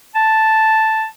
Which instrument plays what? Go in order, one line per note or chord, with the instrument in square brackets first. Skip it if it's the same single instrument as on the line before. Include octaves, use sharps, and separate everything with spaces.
[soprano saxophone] A5